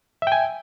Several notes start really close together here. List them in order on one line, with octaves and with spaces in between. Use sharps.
E5 G5 G#5